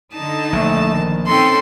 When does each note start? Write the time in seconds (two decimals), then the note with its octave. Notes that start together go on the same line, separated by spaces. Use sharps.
0.14 D3 D#4 A5
0.53 A#1 A3
0.94 D#3
1.26 C4 C#4 D#4 A4 G5 C6